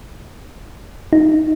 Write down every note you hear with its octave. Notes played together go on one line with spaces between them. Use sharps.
D#4